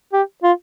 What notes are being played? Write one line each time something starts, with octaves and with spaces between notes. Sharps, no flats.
G4
F4